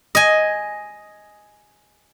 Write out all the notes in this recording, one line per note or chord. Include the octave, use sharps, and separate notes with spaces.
D#5 G#5